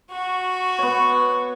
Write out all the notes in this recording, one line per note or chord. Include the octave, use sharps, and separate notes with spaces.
F#4 C#6
B3 C#5